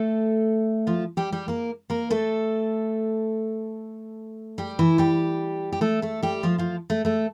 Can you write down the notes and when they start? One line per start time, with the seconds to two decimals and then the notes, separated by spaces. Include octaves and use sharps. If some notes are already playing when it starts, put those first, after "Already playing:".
Already playing: A3 A4
0.87 F3 F4
1.17 G3 G4
1.32 G3 G4
1.48 A#3 A#4
1.90 A#3 A#4
2.10 A3 A4
4.58 G3 G4
4.79 E3 E4
4.98 G3 G4
5.72 G4
5.81 A3 A4
6.02 A3 A4
6.22 G3 G4
6.43 F3 F4
6.58 F3 F4
6.90 A3 A4
7.05 A3 A4